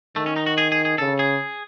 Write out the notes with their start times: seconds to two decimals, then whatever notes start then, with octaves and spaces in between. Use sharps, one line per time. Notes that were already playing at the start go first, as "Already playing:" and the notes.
0.16 D#3 A3
0.26 C#4
0.36 D#4
0.46 F#4
0.58 G#4
0.72 G#4
0.85 G#4
0.98 C#3 A4
1.19 G#4